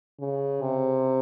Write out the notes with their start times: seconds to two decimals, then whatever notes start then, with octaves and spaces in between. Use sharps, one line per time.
0.20 C#3
0.61 C3